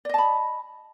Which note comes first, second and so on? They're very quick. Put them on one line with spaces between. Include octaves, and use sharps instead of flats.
D5 D#5 A5 B5